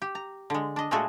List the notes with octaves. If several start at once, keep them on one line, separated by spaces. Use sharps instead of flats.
G4
A#5
D3 G#3
D4 D#5
A#2 G#3 A3 F#4 G#4 A4